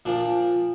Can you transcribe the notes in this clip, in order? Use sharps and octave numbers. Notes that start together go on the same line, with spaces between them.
A#2 F3 D4